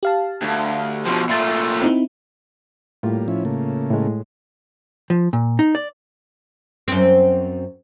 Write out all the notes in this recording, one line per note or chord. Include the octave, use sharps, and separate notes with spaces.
G4 F5 A5
D2
B2 F3
A#2 A3 E5 C6 A6
C4 D#4 E4
A2 G3 A#3 F4
F3 C#4 E4
C#3 A3 A#3
A2 G#3
F3
A#2
D#4
D5
F#2 C4